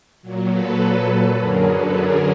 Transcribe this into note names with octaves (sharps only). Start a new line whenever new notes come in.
A#2 F#3
A4 B4
F#2 D3 F#3 G#4 A#4
A4 B4
G#4 A#4